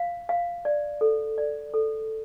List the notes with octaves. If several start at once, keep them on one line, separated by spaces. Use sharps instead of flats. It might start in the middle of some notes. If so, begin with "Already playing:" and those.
Already playing: F5
F5
D5
A4
D5
A4